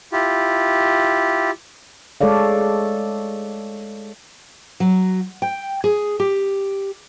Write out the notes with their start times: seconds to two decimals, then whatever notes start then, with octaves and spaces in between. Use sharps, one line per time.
0.12 E4 F4 G4
2.21 G#3 A4 C#5 D5 F5
4.80 F#3
5.42 G5
5.84 G#4
6.20 G4